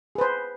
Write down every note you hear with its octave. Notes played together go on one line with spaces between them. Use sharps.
G#4 B4 C5